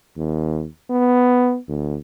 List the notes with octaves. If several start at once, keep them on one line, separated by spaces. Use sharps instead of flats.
D#2
B3
D2